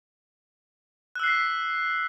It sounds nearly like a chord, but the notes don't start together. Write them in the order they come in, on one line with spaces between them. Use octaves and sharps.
F#6 E6 C7 B6